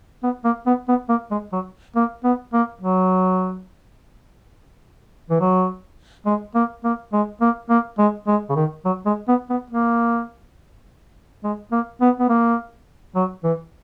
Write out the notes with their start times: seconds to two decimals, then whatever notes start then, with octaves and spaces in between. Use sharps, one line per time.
0.23 B3
0.44 A#3
0.67 B3
0.88 B3
1.09 A#3
1.31 G#3
1.53 F#3
1.96 A#3
2.24 B3
2.53 A#3
2.81 F#3
5.30 E3
5.40 F#3
6.26 G#3
6.55 A#3
6.84 A#3
7.13 G#3
7.41 A#3
7.70 A#3
7.98 G#3
8.27 G#3
8.49 C#3
8.56 D#3
8.85 F#3
9.06 G#3
9.28 B3
9.50 B3
9.70 A#3
11.44 G#3
11.72 A#3
12.01 B3
12.20 B3
12.29 A#3
13.15 F#3
13.44 E3